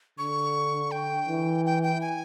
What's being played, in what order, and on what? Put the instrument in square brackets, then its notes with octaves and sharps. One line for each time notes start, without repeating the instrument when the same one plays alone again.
[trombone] D3 [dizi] C#6
[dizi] G5
[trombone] E3
[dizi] G5
G5
G#5